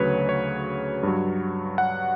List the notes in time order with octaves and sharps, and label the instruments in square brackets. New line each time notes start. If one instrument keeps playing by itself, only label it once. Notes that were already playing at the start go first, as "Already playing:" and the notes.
Already playing: [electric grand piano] D2 C#3 F#3 B4 C#5
C#5
G2 F#3
F#5